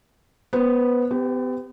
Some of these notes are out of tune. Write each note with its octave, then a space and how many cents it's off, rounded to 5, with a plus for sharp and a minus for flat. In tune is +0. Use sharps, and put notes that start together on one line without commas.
B3 -10 C5 +0
B3 +40 G4 +5